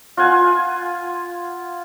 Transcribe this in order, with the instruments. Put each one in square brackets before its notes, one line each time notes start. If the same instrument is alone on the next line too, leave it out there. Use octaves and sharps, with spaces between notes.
[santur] F4 F#5 G#5